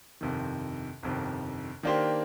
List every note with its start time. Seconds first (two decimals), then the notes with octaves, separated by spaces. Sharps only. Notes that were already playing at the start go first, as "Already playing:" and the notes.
0.21 G1 F2 C3 D#3
1.03 G1 F2 C3 D#3
1.83 D#3 A#3 D4 G4 C5